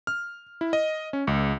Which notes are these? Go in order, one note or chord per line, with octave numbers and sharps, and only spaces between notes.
F6
E4
D#5
C#4
C#2